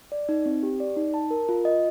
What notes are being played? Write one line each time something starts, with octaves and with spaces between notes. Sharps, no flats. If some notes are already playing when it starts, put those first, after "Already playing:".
D5
D#4
C4
G4
D5
D#4
A5
A#4
F4
D#5